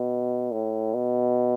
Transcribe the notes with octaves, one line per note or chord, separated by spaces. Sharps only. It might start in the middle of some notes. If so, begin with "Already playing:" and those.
Already playing: B2
A2
B2